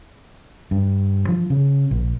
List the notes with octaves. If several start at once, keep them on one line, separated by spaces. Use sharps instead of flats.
G2
F3
C#3
A#1